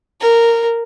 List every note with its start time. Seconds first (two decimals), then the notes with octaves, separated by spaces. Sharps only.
0.21 A#4